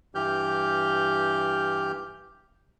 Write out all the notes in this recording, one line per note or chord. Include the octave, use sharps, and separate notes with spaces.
G2 E3 G4 F6 G6